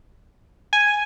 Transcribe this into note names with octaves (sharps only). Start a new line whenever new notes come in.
G#5